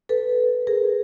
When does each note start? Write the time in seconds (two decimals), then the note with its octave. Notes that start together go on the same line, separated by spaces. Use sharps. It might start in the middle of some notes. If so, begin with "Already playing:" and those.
0.09 A4 B4
0.67 G#4 A#4